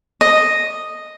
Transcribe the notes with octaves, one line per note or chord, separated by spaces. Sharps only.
D#5